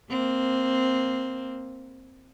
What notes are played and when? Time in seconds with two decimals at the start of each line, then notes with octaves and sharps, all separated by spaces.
0.10 A#3 C4